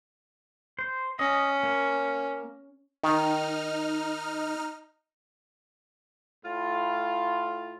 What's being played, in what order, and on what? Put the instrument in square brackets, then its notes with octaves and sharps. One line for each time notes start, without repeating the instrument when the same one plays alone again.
[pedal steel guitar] C5
[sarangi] C#4 [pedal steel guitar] D#5
[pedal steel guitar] A#3
[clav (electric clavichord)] D#3 [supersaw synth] D#4 F6
[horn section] A2 F4